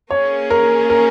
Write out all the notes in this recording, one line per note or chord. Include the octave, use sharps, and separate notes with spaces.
A#3 C#4 G#4 C#5
A#4
A#4